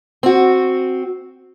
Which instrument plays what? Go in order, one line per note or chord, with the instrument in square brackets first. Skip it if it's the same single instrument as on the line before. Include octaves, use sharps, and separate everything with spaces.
[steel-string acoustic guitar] C4 F#4